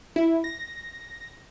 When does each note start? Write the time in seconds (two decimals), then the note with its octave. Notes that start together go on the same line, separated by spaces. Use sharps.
0.16 E4
0.44 A#6